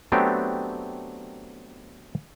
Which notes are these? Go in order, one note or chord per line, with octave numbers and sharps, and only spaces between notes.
F#3 A3 B3 C4 D4 G4